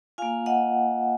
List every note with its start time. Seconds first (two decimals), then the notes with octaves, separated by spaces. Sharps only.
0.18 A#3 F4 F5 G#5
0.46 D#5 F#5